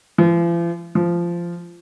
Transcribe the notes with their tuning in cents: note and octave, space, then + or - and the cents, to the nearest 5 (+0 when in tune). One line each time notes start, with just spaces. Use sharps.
F3 -45
F3 -15